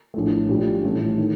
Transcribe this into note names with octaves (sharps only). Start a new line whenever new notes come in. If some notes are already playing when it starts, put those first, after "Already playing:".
A#1 A2 A3
A#1 A#2 G3
A1 A2 A3
D#3